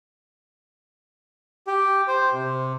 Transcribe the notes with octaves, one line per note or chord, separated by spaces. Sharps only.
G4
C5
C3